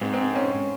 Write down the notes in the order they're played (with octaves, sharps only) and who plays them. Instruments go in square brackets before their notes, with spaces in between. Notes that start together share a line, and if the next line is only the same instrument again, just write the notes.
[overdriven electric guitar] G#2 [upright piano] C4
[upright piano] C4
C#4